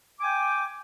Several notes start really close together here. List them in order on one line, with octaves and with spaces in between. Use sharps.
D6 G#5 G5